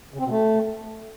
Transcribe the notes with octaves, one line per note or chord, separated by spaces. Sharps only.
C#3
C4
B2
A3